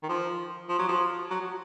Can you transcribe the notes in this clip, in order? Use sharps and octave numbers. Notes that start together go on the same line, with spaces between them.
D#3
F3
F3
F#3
F3
F#3
F#3